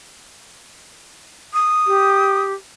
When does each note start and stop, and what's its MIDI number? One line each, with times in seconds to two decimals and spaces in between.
1.54 2.42 87
1.87 2.53 67